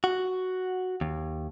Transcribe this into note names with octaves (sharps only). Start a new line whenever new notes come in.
F#4
D#2